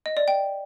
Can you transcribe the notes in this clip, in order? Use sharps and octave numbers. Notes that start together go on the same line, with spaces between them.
D#5
D5
G5